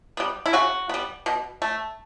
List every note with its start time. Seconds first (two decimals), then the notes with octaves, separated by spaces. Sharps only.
0.17 G3 B3
0.46 E4
0.53 C#3 F#4
0.89 G3 B3
1.26 B2
1.62 A3